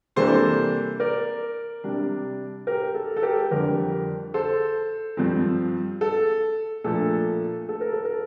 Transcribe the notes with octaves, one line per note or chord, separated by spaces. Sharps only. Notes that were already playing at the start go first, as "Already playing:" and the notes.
C3 E3 G3 A#3 D4 A4 C5
A#4 D5
C3 G3 D4
G4 A#4
A4
A4
G4 A#4
F2 D3 G3 D4 G4 A#4
A4 C5
G2 F3 C4
A4
A#2 F3 A3 D4 A4
A4
A#4
A4
A#4